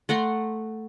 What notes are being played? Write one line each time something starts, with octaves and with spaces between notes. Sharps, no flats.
A3 F#5 A#5 C6